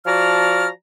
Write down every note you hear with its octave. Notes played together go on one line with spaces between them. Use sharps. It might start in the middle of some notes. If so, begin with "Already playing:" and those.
F3 F#4 D5 A5 A#5 F6